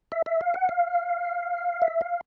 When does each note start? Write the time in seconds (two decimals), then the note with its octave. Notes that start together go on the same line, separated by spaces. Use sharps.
0.12 E5
0.26 E5
0.41 F5
0.54 F#5
0.69 F5
1.82 E5
2.01 F5